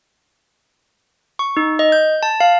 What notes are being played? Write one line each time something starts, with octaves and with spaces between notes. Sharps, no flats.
C#6
D#4
D#5
G6
A5
F5